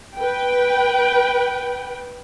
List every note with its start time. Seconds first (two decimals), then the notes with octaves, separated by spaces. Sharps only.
0.16 B4 G5